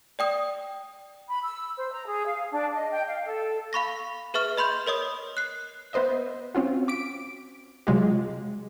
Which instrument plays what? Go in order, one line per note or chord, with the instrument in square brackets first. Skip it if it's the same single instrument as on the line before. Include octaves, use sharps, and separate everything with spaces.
[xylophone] D5 G5 D#6
[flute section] B5
E6
C5
A#5
G#4
F5
D4
D#5
G5
F5
A4
[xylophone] F5 B5 C#6 A#6
G#4 B4 E5 C#6 F6
D#5 B5 C6 G6
A#4 C#5 D#5 D#6
F#6 C7
[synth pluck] B3 B4 C5 D#5 E5
C4 C#4 F4 F#4
D6 B6 D7
C3 F#3 G#3 F4 G4